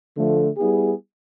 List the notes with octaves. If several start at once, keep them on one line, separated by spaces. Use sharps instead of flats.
D3 F3 A3
G3 B3 E4 G#4